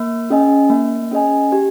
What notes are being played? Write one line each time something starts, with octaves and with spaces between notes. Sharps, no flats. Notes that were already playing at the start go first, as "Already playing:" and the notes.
Already playing: A#3
C#4 G#4 D#5 G#5
A#3
C#4 G#4 D#5 G#5
G4